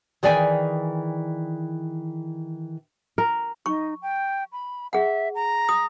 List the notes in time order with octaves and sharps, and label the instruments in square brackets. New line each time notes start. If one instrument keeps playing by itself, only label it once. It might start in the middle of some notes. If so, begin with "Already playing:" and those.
[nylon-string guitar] D#3 E3 G#4 D5 G5 G#5
[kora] A#4
[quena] D#4 [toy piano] C#6
[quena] G5
B5
[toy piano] G#4 F#5 [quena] E5
[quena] A#5
[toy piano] D#6